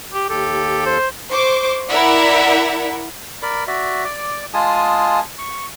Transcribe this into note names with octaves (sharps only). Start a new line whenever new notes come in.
G4
D#2 G4 A4
C5
C5 C#6 D6
E4 A#4 D5 E5 F#5
A#4 D5 B5
F#4 D5 E5
D5 D6
G#3 F4 G#4 G#5 A5 D#6
C#6